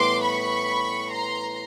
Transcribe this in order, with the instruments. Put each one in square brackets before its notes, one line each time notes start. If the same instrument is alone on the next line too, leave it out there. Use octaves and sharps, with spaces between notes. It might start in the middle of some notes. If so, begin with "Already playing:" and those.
Already playing: [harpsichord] A2 E3 G3 B3 [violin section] C6 D6
[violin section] B5 C#6
A#5 C6